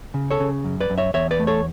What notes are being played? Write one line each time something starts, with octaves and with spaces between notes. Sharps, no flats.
C#3
A4 C#5
C#3
F#2
B4 D5
F#2
C#5 E5
E2 C#5 E5
B4 D5
A3
A4 C#5